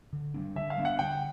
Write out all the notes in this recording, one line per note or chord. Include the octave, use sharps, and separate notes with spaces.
D3
G3 B3 D4
D3 E5
F5
G3 B3 D4
F#5
D3 G5